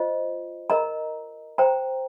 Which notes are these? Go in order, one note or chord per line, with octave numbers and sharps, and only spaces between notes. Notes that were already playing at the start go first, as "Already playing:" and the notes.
Already playing: F4 C5 D#5
A#4 D#5 A#5
C5 G5 A#5